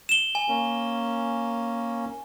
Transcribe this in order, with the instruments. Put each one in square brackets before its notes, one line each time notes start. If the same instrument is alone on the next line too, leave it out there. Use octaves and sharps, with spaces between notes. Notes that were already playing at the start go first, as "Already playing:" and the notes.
[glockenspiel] E7 G7
G#5
[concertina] A#3 C#4